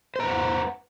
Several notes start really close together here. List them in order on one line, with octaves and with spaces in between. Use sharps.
C5 A#5 B4 F#5